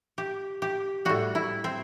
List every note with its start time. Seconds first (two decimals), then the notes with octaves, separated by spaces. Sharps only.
0.18 G4
0.62 G4
1.05 A2 G3 F#4
1.35 E4
1.64 C4